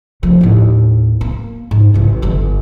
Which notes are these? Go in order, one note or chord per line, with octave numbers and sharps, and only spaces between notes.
F3 A3
D#2 A2
A#3
G#2
A1 E3
G1 G2